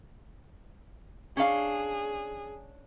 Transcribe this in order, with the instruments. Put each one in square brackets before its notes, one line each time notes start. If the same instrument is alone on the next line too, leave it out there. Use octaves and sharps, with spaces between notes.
[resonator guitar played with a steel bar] C#4 D4 F5 [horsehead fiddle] G#4